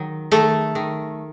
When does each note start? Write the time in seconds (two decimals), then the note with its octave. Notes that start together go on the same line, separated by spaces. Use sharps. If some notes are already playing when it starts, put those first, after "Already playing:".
Already playing: D#3 F#3
0.31 D#3 A3 A4
0.75 D#3